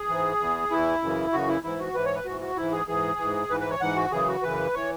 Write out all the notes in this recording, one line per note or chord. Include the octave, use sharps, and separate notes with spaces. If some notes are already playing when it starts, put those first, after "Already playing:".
Already playing: G#4
G#2 E3
E2 E3
E2 E3 E4
F#2 C#3 E3
F#2 C#3 E3 F#4
E4
G#2 E3 E4
F#4
G#2 E3 B4
C#5
B4
G#2 E3 F#4
F#4
G#2 E3 E4
G#4
G#2 E3 G#4
G#2 E3
G#2 E3 B4
B4
C#5
G#2 E3 F#5
F#4
F#2 C#3 E3 G#4
F#4
F#2 C#3 E3 B4
E3 C#5